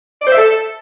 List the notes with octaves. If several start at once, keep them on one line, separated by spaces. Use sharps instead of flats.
D5
C5
E5
A4